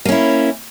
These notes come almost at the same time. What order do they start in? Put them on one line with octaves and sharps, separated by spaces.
A#3 C#4 E4